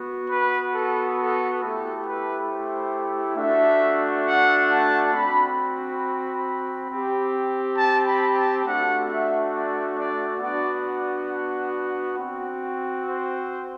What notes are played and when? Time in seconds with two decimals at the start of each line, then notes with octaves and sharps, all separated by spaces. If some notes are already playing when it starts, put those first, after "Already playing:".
Already playing: B3 F#4
0.29 B4
0.73 A4
1.17 A4
1.61 A3 E4 G4 A4
2.05 B4
2.49 C5
3.36 A3 D4 F#4 E5
4.25 F#5
4.69 A5
5.13 C4 F#4 B5
5.57 B5
6.90 C4 G4
7.76 A5
8.06 B5
8.36 A5
8.64 A3 D4 F#4 F#5
9.08 E5
9.52 D5
9.97 D5
10.41 B3 D4 F#4 D5
12.17 C4 F#4
13.05 C5